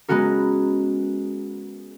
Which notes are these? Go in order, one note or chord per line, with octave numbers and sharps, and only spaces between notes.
G#3 B3 C#4 F#4 A#4